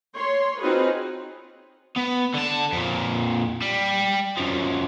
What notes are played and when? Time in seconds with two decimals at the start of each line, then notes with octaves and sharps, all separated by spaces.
0.15 C#5 C6
0.60 C4 D#4 F4 F#4 G#4 B4
1.97 B3
2.35 D3 A5
2.73 F2 A#2
3.61 G3
4.37 F#2 F3